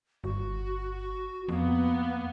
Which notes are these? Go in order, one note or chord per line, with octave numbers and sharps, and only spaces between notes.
G1 F#4
F2 A#3 B3